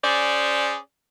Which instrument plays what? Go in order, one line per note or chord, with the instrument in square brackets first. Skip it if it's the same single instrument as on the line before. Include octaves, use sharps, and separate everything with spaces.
[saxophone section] C#4 G#4 C5 D5